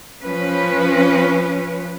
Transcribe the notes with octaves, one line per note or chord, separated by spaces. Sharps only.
F3 C#4 B4